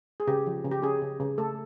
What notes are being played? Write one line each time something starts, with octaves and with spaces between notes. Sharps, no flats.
G#4
C#3 G4
F3
C#3
G4
C#4 G#4
C#3
C#3
A3 A4